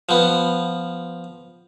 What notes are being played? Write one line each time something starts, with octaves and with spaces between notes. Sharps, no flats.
F3 B3